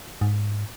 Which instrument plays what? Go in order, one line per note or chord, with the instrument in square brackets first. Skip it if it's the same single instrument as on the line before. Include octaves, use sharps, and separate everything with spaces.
[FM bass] G#2